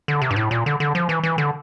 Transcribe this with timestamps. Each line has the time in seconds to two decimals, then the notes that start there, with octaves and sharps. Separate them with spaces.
0.08 D3
0.22 C3
0.31 G2
0.36 A2
0.51 A#2
0.66 D3
0.80 D3
0.95 F3
1.09 E3
1.23 E3
1.38 D3